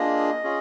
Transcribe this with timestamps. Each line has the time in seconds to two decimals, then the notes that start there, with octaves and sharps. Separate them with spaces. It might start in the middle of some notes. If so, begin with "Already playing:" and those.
Already playing: A#3 D4 F4 G#4 D#5
0.44 C#4 F4 G#4